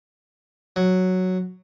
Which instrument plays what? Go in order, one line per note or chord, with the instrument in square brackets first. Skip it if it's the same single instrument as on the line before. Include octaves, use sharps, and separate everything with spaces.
[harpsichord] F#3